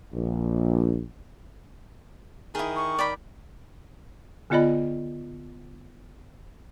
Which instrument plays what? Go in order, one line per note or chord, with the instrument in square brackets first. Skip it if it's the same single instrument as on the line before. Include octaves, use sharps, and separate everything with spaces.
[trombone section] A#1
[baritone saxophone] D#3 [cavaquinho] E4 G#4
[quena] C#6
[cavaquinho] D5 G5 B5
[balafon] D3 B3 F4 D5 D#5 B5